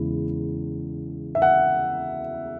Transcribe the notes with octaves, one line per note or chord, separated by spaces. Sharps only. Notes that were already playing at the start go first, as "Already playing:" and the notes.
Already playing: E2 C#3 G#3 E4
E5
F#5